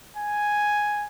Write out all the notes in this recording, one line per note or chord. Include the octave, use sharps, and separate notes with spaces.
G#5